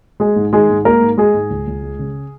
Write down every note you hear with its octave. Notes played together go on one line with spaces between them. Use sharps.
G#3 G#4
G#2
D#3 G#3 G#4
G#2
G#3 A#3 A#4
G#2
G#3 G#4
G#2
C#2
C#2
G#3
C#3